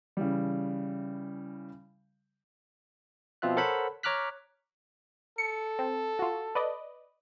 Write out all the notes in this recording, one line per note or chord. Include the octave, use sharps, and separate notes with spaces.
C#3 E3 G3
B2 F3 C4 F4 E5 F#6
A4 A#4 C5 C#5 F#5 B5
C#5 A#5 D6 F6 F#6 B6
A4 C#7
C4
F4 F#4
B4 D5 D#5